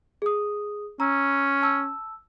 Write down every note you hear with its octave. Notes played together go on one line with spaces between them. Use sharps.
G#4 D#6
C#4 A#5 E6
A5 E6